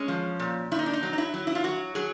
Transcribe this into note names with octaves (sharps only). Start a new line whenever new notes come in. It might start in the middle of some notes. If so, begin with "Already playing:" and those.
Already playing: G#3 C#4
F3
A#2
A#2 E4
D#4
D4
D#4
F#3
D#4
E4
F#3
E4
F4
F#3 F#4
F#3 G#4